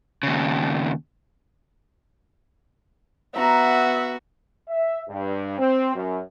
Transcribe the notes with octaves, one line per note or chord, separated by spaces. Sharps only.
D#2 C#3
B3 F#4 E5 A#5
E5
G2
C4
F#2